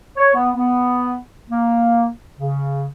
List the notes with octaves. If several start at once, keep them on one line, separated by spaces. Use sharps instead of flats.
C#5
B3
B3
A#3
C#3